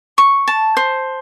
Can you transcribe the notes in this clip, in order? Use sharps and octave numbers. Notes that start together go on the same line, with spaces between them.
C#6
A5
C5